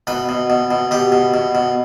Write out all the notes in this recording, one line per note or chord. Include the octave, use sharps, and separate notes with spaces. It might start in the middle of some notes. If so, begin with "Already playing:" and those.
B2 B4
B2
B2
B2
B2 G4
B2
B2
B2